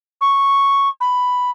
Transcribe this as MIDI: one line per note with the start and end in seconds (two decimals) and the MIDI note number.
0.21 0.89 85
1.00 1.50 83